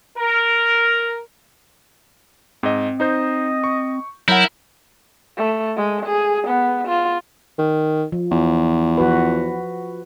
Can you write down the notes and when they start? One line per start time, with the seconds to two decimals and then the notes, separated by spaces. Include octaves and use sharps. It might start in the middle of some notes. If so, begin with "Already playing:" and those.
0.17 A#4
2.63 G#2 C4 D#5
3.00 D#4 C5 D#5 G6
3.64 C#6
4.28 F#3 E4 A#4 F#5 G6
5.38 A3
5.77 G#3
6.05 G#4
6.47 B3
6.87 F4
7.59 D#3
8.12 F3
8.31 E2
8.98 F3 F#4 B4